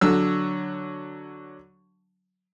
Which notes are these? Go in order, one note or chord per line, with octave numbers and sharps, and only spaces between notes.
D3 F#3 E6